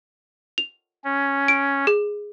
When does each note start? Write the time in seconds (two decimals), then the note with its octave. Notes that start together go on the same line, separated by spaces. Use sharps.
0.58 F7
1.04 C#4
1.48 D7
1.87 G#4